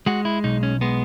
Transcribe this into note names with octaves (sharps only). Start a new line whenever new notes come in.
G#3 F#4
E4
B1 D#4
C#4
G#3 B3